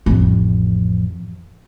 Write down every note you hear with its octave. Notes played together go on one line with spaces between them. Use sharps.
A1 F2